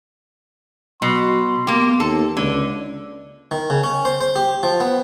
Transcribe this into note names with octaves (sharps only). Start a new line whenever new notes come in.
B2 F#3 C6
A#3 B3 G4
D#2 A4
C#2 D3
D#3
C#3
C#4
C5
C5
G4
F3
B3